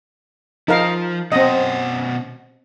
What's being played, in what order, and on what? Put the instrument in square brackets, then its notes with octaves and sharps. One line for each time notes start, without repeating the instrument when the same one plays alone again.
[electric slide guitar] F3 [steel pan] D#4 A#4 F5
[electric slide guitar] B2 C#4 F#5 [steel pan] C4 D#5